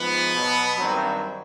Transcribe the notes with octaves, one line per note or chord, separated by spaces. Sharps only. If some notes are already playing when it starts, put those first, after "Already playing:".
Already playing: G#2 F3 B3
B2 F#3
G2 D#3 F#3 C4